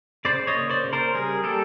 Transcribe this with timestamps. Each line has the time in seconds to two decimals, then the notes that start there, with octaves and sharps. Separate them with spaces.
0.25 C#3 C5 D5
0.47 C#5 D#5
0.55 A#3
0.70 C5 D5
0.84 C#3
0.93 A#4 C5
1.14 G3 G#4 A#4
1.44 A#3 G4 A4